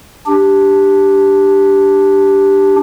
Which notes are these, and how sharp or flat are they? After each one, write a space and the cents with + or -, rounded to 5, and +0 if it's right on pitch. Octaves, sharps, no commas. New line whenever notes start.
D4 +0 G4 +0